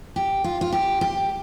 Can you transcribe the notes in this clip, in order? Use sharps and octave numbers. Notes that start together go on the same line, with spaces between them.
G4
F4
F4
G4
G4